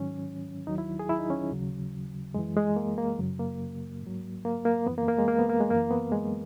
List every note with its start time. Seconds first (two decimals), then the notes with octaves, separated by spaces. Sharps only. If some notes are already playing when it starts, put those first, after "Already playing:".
Already playing: G#2 D#3 F#3 C#4
0.67 D#2 D#3 F#3 D#4
0.78 E4
0.99 G#4
1.09 E4
1.19 D#4
1.30 C#4
1.51 D#2 C#3 F#3
2.34 F#2 E3 G#3
2.57 G#3
2.76 A#3
2.98 A#3
3.19 F#2 C#3 F#3
3.39 A#3
4.02 G#2 F#3
4.45 A#3
4.65 A#3
4.87 F#2 E3 B3
4.98 A#3
5.08 A#3
5.18 G#3
5.28 A#3
5.39 B3
5.50 A#3
5.60 G#3
5.71 F#2 E3 A#3
5.91 B3
6.12 G#3